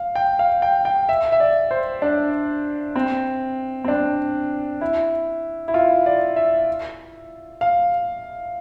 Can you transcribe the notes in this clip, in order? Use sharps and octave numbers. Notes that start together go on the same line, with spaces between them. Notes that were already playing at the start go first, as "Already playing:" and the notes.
Already playing: F5
G5
F5
G5
G5
E5
E5
D5
C5
D4
C4
C4
D4
E4
E4
F4
D5
E5
F5